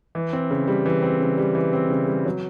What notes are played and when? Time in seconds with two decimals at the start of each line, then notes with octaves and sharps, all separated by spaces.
0.15 E3
0.33 C4
0.51 C#3
0.68 G3
0.86 E3
1.02 C4
1.21 C#3
1.38 G3
1.55 E3
1.73 C4
1.90 C#3
2.08 G3
2.26 F#3